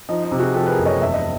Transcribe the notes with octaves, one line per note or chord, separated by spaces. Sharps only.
F3 D#4
D#4
C3
F#4 G#4
F3 G4 A4
B4
G#4 A#4
F#1
C#5 D#5
E1 E5
D#5